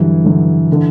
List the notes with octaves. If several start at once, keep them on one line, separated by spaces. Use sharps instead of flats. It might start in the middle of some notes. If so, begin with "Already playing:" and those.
Already playing: G2 D3 E3 F#3
G2 D3 F#3
D3